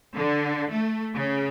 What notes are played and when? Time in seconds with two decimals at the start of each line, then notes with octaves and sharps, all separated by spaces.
0.15 D3
0.71 A3
1.15 C#3